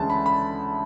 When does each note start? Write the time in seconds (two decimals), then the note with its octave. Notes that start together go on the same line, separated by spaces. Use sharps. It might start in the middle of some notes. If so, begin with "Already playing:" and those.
Already playing: D2 C#3 E3 G#3 A5
0.10 B5
0.26 B5